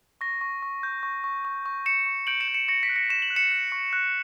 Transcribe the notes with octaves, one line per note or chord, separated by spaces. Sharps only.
C#6 A#6
C#6
C#6
G6
C#6
C#6
C#6
C#6
C#6 C#7 E7
C#6
G6 D7 F#7
C#7 E7
G6
C#7 E7
C#6 A#6 C#7
B6 D7
F#6
A#6 C#7
C#6 E7
F#7
F#6
C#7 E7
F#6
C#6
F#6